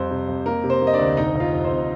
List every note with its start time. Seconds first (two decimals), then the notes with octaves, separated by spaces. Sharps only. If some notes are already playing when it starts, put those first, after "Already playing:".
Already playing: F2 G3 C5
0.11 C3
0.28 F2
0.46 A#3 A#4
0.64 C3
0.70 C5
0.82 A#3
0.87 D#5
0.93 D4 D5
0.99 D2
1.17 F1 D#4 D#5
1.34 F1
1.40 F4 F5
1.52 F2
1.65 C5
1.70 F2